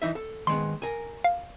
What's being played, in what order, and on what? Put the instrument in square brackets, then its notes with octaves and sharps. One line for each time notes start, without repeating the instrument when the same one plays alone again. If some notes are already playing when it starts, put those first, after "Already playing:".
[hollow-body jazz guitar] E3 D#4 E5
A4
[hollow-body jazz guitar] D#3 G#3 B3 [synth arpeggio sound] C6
[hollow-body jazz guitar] A#4 G#5
[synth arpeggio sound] F5